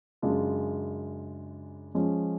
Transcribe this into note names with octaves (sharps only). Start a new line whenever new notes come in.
F#2 C#3 G#3 D4 F4
F3 G#3 C#4